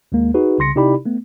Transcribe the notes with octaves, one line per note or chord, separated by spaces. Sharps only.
D#2 G#3 A#3
D#4 F#4 G#4 B4
C2 C#3 C6 A#6 C#7
C3 D#4 E4 G4 D5 B5
A3 B3